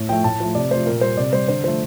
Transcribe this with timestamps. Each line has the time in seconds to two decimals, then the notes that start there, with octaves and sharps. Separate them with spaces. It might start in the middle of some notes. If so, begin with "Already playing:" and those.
Already playing: A2
0.09 F3 A3 G5
0.24 A2 A5
0.40 F3 A3
0.55 C3 D5
0.71 F3 A3 C5
0.86 A#2 A#4
1.01 G3 C5
1.17 C3 D5
1.33 G3 C5
1.48 D3 C5
1.64 F3 A3 C5